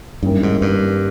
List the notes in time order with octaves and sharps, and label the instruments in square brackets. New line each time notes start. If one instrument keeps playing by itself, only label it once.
[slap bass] G2 [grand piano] D#3 G3 A#3 C#4 E4
[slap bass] G#2
G2